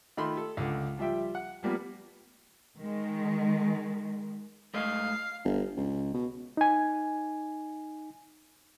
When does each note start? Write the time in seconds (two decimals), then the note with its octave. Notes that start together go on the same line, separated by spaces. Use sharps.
0.17 D#3 A3 F4 B5 C6
0.37 A4
0.57 C#2 D3
0.98 F3 G3 F4 E5 G5
1.35 F#5
1.63 F3 G3 A#3 B3
2.77 D#3 G#3
4.74 G#2 A3 D#5 F5
5.45 G1
5.77 C#2
6.14 B2
6.57 D#4 G#5